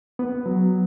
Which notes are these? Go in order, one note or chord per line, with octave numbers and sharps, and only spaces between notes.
B3
F#3